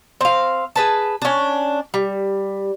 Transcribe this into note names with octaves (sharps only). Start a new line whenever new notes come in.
C4 F5
G#4 B4 A5
C#4 D4
G3